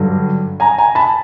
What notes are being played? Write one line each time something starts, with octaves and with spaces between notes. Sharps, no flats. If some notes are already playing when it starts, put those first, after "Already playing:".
Already playing: G2 D3 F#3
G#5 A#5
G#5 A#5
A5 B5